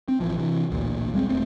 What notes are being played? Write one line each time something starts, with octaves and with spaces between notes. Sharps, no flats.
C4
A1 E3 F3
C3 E3
A1 D2 A#2
A#1 G3 G#3 C4
E1 A3 C4